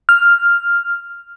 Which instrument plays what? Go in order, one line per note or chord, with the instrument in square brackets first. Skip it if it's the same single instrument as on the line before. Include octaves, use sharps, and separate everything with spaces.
[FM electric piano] F6